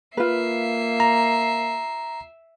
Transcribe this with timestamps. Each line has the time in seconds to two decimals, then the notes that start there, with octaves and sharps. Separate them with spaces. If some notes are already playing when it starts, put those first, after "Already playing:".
0.17 A#3 F4 B4 E5 C7
1.00 A#5